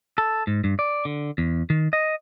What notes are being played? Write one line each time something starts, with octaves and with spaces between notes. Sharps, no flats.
A4
G#2
G2
D5
D3
E2
D#3
D#5